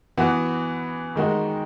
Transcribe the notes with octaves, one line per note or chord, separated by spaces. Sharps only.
E3 B3 F#4 B4
D#3 G#3 D#4 F#4